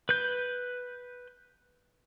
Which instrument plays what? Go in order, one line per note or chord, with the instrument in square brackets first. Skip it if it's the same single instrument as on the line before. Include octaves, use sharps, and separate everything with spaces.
[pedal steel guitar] B4 G6